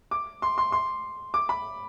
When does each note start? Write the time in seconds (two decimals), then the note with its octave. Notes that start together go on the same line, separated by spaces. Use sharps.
0.11 D6
0.42 C6
0.58 C6
0.72 C6
1.34 D6
1.49 B5